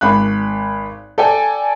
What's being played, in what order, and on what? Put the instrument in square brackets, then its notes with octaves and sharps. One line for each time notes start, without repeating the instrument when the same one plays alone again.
[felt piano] G#1 B5 F#6
A4 D5 G5 G#5